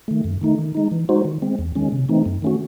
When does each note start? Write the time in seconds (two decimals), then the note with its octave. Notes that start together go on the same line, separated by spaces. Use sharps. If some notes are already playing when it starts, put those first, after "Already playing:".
0.08 D#3 A3
0.24 F#2
0.41 D#3 A3 D#4
0.59 D#3
0.75 G#3 D#4
0.91 E3
1.09 G#3 D#4 F#4 C5
1.25 D#3
1.42 G#3 C4
1.59 E2
1.75 D#3 G#3 C#4
1.92 C3
2.09 E3 A3 C4 D#4
2.25 F#2
2.42 D#3 A3 C#4 F#4